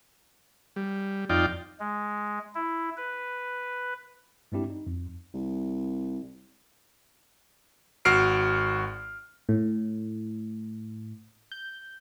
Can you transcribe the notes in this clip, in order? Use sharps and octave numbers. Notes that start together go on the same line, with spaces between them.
G3
F2 D#4 F4 D5 G5
G#3
E4
B4
G2 G#3 C4 D4 E4 G4
D#4
F2
C2
G#1 F#4 F6 C7 D7
A2
G6